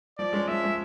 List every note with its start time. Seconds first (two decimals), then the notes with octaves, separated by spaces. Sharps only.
0.18 F3 D5
0.33 G#3 C#4
0.48 F3 E5
0.63 G#3 C#4